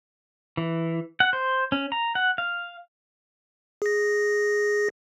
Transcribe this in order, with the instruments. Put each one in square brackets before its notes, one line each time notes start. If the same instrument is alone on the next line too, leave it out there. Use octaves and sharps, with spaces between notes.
[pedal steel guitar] E3
F#5
C5
C#4
A#5
F#5
F5
[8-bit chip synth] G#4 A#6